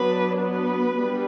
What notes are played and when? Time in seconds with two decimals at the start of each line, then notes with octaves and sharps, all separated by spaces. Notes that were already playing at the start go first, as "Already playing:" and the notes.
Already playing: F#3 B3 D4 B4
0.38 B3 B4
0.97 G3 B3 D4